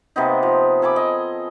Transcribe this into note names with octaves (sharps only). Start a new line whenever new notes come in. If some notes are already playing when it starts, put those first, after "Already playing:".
C3 A#3 B3 D#4
F3
A4 G#5 B5 D6
D#5